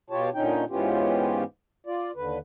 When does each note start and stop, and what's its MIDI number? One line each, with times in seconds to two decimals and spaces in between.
0.10 0.30 47
0.10 0.30 65
0.10 0.30 67
0.10 0.30 73
0.10 0.30 81
0.34 0.64 46
0.34 0.64 50
0.34 0.64 61
0.34 0.64 63
0.34 0.64 79
0.70 1.44 44
0.70 1.44 52
0.70 1.44 59
0.70 1.44 61
0.70 1.44 65
0.70 1.44 67
1.86 2.11 65
1.86 2.11 74
2.16 2.39 39
2.16 2.39 50
2.16 2.39 71